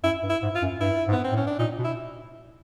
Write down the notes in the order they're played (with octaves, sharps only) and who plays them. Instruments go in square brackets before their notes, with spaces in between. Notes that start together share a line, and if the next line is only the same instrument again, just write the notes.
[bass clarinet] F#2 [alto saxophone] E4
[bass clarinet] G2
[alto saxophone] E4
[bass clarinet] G#2
[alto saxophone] F4
[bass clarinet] F#2
[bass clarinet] G2 [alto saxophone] E4
[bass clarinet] G#2
[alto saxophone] B3
C4
[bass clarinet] A2
[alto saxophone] C#4
D4
[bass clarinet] A#2 [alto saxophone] D#4
[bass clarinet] B2
[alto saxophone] E4